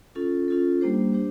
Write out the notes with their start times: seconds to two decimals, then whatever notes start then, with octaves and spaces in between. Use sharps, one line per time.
0.15 C#4 F4 A4
0.48 C#4 F4 A4
0.81 G3 A#3 D4 G4 C5
1.13 D4 G4 C5